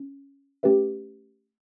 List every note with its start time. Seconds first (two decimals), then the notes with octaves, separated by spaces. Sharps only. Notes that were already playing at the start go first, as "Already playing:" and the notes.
Already playing: C#4
0.63 A3 C#4 G4 B4 E5